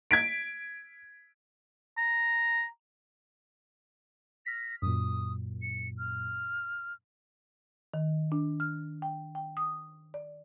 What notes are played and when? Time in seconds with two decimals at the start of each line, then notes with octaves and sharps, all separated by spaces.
0.11 G#6 B6 D7
1.97 A#5
4.46 F6 A#6 B6
4.82 F#2 A#2 D#6
5.62 C#7
5.99 F6
7.94 D#3
8.32 D4
8.60 F6
9.02 G5
9.35 G5
9.57 D#6
10.14 D5